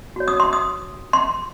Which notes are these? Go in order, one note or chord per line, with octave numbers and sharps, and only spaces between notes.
F#4 C#5
D#6
C6
D#6
C6